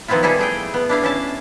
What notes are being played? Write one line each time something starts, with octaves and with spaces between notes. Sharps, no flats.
D#3 F3 B3 C4 E4 F4
G3 E4 G#4 A4
A3 G#4 G5
B3
D4 E4 F5
C#4 E4 A5